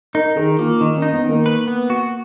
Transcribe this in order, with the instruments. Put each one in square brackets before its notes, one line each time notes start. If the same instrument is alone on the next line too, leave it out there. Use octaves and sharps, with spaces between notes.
[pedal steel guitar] D#4 [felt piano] A#4
[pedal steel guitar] D#3 [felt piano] G#4
[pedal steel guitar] A#3 [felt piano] F4
[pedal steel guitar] D#3 [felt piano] D#4
[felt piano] C#4
[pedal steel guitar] D#4
[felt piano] B3
[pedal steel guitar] D#3 [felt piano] A#3
[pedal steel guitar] B4
B3
F#4